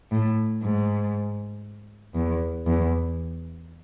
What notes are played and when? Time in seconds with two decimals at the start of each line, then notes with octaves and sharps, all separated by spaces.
0.11 A2
0.63 G#2
2.15 E2
2.67 E2